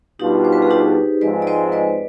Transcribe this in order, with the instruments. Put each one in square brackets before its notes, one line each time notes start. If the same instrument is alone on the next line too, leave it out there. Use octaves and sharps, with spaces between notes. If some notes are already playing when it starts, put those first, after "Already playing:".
[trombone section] B2 G3 D4 F4 [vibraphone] D#4 G4
[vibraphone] C5
B4
G#4
D#4 G4
[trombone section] G#2 F3 G#3 C4 [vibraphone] B4 D5
[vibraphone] D5
C5 D#5
B4 D5